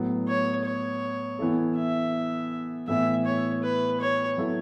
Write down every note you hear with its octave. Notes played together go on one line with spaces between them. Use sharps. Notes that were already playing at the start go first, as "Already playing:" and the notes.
Already playing: A2 F#3 B3
C#5
C#5
E3 B3 E4 A4
E5
A2 E3 B3 E4 E5
C#5
B4
C#5
F#3 B3 E4 A4